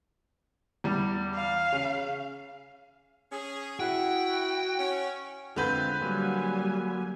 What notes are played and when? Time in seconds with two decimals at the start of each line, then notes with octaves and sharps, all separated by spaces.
0.84 E2 G3
1.34 F5
1.72 C#3
3.32 C#4 G#4
3.80 E4 F#4 G5
4.79 C#4
5.56 D3 G#3 C4 F4 B4 G6
6.01 F#3 G3 A#3 G#5